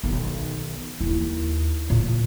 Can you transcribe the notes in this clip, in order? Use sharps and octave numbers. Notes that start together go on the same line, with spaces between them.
B1 D#3
D#2 E4
A#2